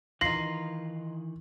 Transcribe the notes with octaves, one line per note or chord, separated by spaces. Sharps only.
D#3 E3 D#4 F4 A#6 C7 F#7